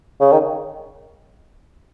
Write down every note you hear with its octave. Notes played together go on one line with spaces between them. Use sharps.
C#3
D#3